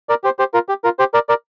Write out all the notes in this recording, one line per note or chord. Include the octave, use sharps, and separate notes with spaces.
A#4 D5
G4 C5
G4 C5
F4 A#4
G4
F4 A#4
G4 C5
A#4 D5
A#4 D5